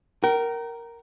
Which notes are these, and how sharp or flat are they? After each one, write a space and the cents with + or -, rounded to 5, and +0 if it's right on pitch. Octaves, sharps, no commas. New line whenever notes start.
A#4 +0 G5 -40